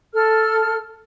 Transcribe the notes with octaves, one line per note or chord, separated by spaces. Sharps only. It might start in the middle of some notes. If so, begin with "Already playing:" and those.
A4 F6